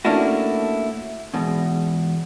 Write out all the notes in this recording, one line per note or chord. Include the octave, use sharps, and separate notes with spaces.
A3 A#3 C#4 D4 E4 F#4
E2 G#2 B2